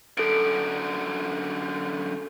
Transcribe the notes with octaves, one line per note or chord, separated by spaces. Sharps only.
F#2 D3 A4 D7